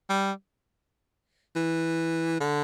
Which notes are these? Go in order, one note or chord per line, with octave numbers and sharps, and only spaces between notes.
G3
E3
D3